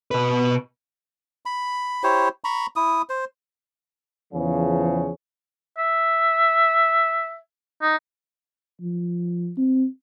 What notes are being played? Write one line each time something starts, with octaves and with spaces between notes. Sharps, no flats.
B2 B4
B5
E4 G4 C5 C#5
A#5 B5 C#6
E4 D#6
C5
E2 C#3 F3
E5
D#4
F3
C4